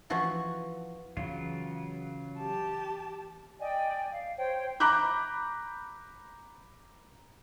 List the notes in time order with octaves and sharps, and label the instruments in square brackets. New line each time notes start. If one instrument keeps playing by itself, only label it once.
[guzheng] E3 F3 F#4
[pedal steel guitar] C#3 F#3 F4 [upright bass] E3
[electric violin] G4 A5
[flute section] D5 D#5 G5 G#5
F5
C5 C#5 G5
[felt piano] A#5 B5 D6 F#6 G6